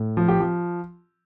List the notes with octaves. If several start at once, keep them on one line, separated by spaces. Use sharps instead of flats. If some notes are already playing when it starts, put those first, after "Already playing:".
Already playing: A2
F3
G4
F3